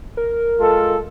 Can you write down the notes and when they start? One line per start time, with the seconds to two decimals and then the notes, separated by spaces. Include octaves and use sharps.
0.17 A#4
0.60 G#3 F4 A4